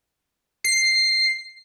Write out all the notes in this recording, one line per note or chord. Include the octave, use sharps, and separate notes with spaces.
C7